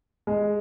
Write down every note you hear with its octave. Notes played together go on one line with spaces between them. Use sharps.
G#3